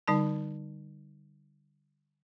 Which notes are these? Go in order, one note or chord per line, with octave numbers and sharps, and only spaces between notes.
D3 G3 D#4 A5